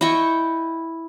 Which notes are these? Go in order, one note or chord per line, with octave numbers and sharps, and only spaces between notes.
E4 D#5 G5 C#6